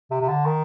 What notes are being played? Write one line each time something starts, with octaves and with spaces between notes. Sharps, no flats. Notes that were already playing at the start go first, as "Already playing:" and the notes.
C3
C3
D3
D#3